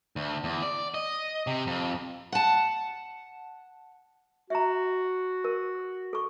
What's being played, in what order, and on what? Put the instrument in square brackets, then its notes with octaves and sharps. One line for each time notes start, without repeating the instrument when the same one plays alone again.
[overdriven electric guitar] D2
E2
D5
D#5
C3
F2
[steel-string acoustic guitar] F#5 A5
[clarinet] F#4 [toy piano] E5 A#5
[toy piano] A#4
A4 C#6